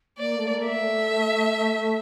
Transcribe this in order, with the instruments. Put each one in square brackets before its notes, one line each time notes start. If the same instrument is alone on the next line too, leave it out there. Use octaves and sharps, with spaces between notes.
[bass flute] A#3 [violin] D5
[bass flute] A3
A#3
[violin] E5
[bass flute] A#3
A3